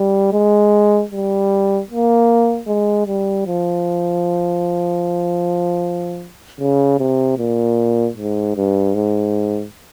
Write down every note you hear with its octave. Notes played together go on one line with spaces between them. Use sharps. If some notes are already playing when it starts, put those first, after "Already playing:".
Already playing: G3
G#3
G3
A#3
G#3
G3
F3
C#3
C3
A#2
G#2
G2
G#2